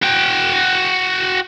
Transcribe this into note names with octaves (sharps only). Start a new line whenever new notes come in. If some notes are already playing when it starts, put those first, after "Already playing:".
F#4 G5